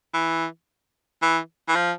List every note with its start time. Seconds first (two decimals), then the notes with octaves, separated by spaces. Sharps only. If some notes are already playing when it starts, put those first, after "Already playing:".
0.14 E3
1.22 E3
1.68 E3
1.76 F3